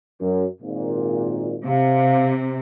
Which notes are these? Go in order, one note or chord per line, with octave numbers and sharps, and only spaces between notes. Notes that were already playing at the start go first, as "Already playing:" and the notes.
F#2
G#1 A#2
C3 C4 F5